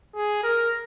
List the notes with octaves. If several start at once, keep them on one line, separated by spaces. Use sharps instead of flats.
G#4
A#4